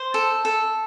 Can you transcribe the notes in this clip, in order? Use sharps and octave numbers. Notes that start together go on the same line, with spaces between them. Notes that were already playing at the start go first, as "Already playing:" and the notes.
Already playing: C5
A4
A4